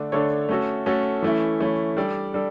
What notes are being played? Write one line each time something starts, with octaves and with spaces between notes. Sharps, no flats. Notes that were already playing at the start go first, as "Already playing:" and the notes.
Already playing: D3 A3 D4 A4
D3 A3 D4 A4 C#5
A3 C#4 F#4 A4
A3 C#4 F#4 A4
E3 A3 C#4 E4
E3 A3 C#4 E4
G3 D4 A4 D5
G3 D4 A4